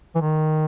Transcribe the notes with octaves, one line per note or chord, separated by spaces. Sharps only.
E3
D#3